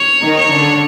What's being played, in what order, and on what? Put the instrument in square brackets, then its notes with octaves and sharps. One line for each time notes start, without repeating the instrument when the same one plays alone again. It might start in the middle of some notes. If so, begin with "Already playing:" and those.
Already playing: [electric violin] C#5
[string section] D#3 D#4
[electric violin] C#5
[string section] D3 D4